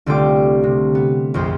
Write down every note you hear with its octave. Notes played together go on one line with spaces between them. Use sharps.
C2 D3 A3 F4 G5 D6
C3
B3
A#1 F2 C5